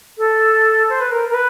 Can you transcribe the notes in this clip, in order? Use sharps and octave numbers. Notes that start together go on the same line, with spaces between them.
A4
C5
B4
A#4
A#4
B4